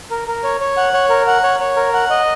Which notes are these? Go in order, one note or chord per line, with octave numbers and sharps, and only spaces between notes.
A#4
A#4
C#5
C#5
F#5
C#5
A#4
F#5
C#5
C#5
A#4
F#5
D#5